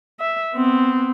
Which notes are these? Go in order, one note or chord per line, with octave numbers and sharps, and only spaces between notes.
E5
B3 C4